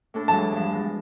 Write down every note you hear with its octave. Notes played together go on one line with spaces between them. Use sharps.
A2 D4 A4
E3 F#3 G#3 A5
E2 G2 F3
F3 G#3